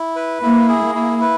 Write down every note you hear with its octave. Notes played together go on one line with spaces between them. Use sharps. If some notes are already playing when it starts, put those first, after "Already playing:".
Already playing: E4
B4
A#3 E4
G#4
A#3
E4
B4